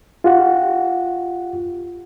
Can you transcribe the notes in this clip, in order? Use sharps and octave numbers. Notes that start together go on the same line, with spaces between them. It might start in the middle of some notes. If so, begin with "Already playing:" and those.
F4 G4 F#5